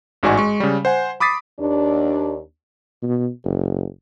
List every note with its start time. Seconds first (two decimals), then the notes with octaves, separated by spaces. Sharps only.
0.23 A1 G#2 F#4 D5 G#5 C#6
0.37 G#3 C#6
0.60 C#3 G3
0.85 C5 F#5 G#5
1.20 B5 D6 D#6 A6 B6 C7
1.60 D#2 D4
3.03 B2
3.44 F#1